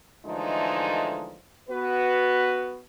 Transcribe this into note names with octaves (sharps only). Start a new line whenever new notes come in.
D3 E3 F3 G#3 A3 D#4
B3 F#4 B4